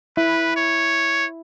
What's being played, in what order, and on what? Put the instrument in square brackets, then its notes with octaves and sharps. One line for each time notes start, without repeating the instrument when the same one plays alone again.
[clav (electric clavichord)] E4 [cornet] B4
[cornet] C#5